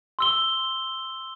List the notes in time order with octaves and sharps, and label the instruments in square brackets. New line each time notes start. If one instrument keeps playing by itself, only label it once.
[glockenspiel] C6 E6 G7